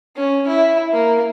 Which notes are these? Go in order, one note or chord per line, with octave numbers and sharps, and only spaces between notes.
C#4
E4
A#3